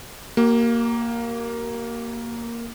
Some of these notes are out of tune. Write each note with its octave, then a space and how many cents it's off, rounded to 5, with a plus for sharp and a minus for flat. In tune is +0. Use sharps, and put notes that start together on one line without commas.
A#3 +0 G4 -45